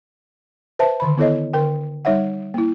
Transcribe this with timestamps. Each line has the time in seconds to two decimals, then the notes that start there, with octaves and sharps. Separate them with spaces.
0.79 B4 C5 E5 A5
1.00 D3 D#3 B5
1.17 B3 E4 A4 C#5 D#5
1.53 D3 A#4 G5
2.05 G3 D#4 C#5 E5 F#5
2.54 A#3 E4